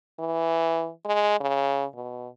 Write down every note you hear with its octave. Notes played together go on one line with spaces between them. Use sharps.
E3
G#3
C#3
B2